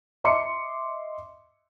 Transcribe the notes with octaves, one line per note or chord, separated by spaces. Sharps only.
D#5 E5 C6 D6 C#7